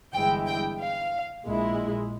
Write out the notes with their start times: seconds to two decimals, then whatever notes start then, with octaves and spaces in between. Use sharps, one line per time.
0.13 G1 G2 E3 G#3 E4 G5
0.46 G5
0.79 F5
1.45 A#1 A#2 G#3 E4